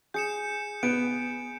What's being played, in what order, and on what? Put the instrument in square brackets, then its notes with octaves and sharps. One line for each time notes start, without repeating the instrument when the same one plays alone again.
[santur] G#4 [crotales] G6 C#7 E7
[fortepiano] B3 [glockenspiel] D7